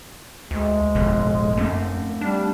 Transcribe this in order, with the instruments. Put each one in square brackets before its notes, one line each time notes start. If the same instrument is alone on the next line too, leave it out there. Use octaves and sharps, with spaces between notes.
[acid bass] D2 [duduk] G#3
[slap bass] D1 F2 B2 [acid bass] G1
[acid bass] F#2 [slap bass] A3 C4
[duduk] G3 [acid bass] D4